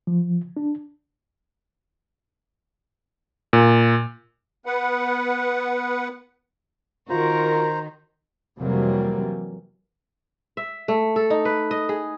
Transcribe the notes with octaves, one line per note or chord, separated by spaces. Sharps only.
F3
D4
A#2
B3 B4 F#5
D#3 F4 F#4 A#4 C5 A#5
F2 C3 E3 F#3 G3 A#3
E5
A3
A4
D#4
B4
D#5
G#4